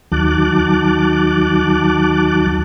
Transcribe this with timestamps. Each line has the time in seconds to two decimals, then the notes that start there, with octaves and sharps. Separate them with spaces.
0.12 D#2 D#3 F#3 A5 D6 F#6